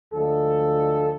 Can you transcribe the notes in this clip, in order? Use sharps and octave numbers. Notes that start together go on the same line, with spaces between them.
D2 D3 F3 G#3 A4